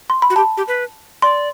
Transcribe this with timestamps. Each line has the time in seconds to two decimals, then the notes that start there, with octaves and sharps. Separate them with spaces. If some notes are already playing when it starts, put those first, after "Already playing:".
0.10 C6
0.22 B5
0.30 F#4
0.36 G4 A5
0.57 G4
0.68 B4
1.22 D5 C6